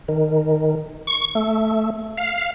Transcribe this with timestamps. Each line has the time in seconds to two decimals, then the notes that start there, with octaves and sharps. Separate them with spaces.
0.08 D#3
1.07 C#6
1.35 A3
2.17 F5